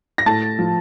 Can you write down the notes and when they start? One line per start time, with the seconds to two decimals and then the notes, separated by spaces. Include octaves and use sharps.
0.18 A#6
0.26 A2 A5 A6
0.59 F3